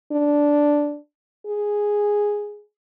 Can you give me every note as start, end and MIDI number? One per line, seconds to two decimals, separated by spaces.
0.12 0.98 62
1.47 2.63 68